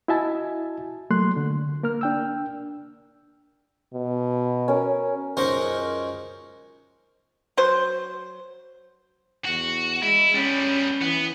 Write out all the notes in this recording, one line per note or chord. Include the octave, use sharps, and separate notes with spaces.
E4 F#4 D#5 E5 G#5 A5
F#3 A3 A#3 C6 F#6
D3
A#3 A#4 F6
D4 G5 E6
B2
C#4 A#4
C#2 F#2 D#4 A#4 C5 C#6
F#3 C5
E2 F#4
G#3 E4
G3 B3 C#4
E3 B3